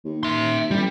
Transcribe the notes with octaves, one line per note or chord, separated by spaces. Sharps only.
D#2
E5 C6
A1 G3